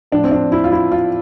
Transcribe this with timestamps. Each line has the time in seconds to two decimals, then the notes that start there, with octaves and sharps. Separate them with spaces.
0.12 A2 F3 D4
0.24 C4
0.32 D4
0.52 E4
0.64 F4
0.72 E4
0.92 F4